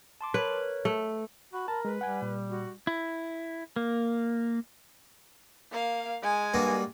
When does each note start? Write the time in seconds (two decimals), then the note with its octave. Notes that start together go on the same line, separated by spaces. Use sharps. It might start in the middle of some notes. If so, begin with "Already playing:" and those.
0.21 A5 C6 D6
0.34 A#4 B4 C#5
0.85 A3
1.53 F#4 B5
1.68 A#4 A5
1.85 G#3 B4
2.01 G3 F#5 G#5
2.22 A#2
2.50 F#4
2.87 E4
3.76 A#3
5.71 A#3 F5
6.22 G#3 G#5
6.54 G2 A#3 F#4